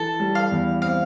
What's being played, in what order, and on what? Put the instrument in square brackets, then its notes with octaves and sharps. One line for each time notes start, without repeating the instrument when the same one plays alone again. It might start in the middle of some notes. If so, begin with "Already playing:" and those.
Already playing: [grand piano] E3 [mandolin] A4
[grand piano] G3
[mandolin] F5
[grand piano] E2
[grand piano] C4 [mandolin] F5